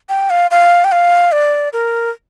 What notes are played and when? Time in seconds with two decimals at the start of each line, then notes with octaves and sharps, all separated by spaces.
0.09 G5
0.30 F5
0.51 F5
0.84 G5
0.92 F5
1.32 D5
1.73 A#4